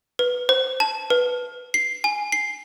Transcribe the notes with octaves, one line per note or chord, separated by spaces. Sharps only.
B4
C5
A5
B4
C7
G#5
C7